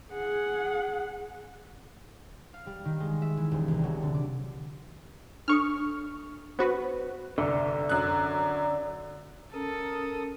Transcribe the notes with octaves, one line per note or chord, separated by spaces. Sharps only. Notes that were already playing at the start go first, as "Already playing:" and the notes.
G#4 F#5
F5
G3
D#3
G#3
E5
E3
D#1
C2
F#3
D3
D6
D4 A4 C#6 D#6 F6
B3 F#4 B4 C5
G1 C2 D3
F#2 F#6
C#4 A4 A#4 D#6